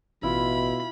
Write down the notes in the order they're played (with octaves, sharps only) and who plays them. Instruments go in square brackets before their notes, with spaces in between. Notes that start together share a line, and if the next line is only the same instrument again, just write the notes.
[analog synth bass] A1 [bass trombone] B2 [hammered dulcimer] E4 F4 E5 [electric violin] B5